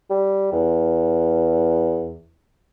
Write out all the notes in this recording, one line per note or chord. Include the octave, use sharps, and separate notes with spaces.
G3
E2